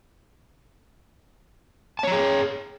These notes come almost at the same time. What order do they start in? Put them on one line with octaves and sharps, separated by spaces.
A5 C#5 A#5 G#4